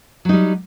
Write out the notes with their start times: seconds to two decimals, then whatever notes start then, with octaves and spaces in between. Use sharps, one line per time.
0.25 F#3
0.29 D#4
0.33 G3